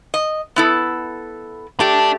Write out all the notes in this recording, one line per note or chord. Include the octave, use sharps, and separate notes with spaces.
D#5
B3 E4 A4
A3 D4 G4